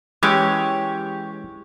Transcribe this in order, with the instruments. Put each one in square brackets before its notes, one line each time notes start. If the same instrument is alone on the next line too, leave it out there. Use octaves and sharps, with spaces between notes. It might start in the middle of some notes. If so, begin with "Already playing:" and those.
[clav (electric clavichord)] E3 G#3 C#4 [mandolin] G4 C#5